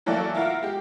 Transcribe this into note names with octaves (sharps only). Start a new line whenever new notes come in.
E3 F#3 A3 A#3 A4 D5
E4 F4 A#4 F#5
G#3 G4